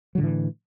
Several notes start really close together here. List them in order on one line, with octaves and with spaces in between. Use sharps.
F#3 D3 A2 E3